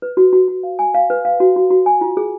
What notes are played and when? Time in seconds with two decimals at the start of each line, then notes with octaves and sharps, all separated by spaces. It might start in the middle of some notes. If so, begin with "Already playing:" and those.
0.02 B4
0.17 F#4
0.33 F#4
0.48 F#4
0.63 F5
0.79 G#5
0.94 F5
1.10 B4
1.25 F5
1.40 F#4
1.56 F#4
1.70 F#4
1.86 G#5
2.01 F4
2.17 G#4